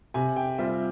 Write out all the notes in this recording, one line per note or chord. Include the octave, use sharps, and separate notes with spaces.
C3 G#5
G5
G3 C4 F4 E5